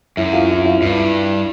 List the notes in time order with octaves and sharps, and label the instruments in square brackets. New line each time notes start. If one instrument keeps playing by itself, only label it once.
[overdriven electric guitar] F#2 [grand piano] E4 E5
[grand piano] F4 F5
E4 E5
F4 F5
[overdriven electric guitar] G2 [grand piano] E4 E5